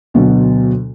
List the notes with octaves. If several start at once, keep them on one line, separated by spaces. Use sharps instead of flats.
D2 B2 F#3